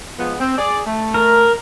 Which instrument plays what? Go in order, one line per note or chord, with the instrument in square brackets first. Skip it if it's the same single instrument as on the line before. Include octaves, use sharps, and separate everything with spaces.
[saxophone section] F3 G#3 B3
C4
G#4 D5
A3
[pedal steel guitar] A#4